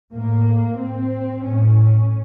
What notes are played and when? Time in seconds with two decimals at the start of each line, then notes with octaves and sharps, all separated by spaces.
0.12 A2 A#3
0.78 C4
1.44 A2 C#4